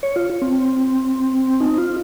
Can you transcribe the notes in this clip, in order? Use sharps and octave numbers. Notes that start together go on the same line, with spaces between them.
C#5
F4
C4
D#4
F4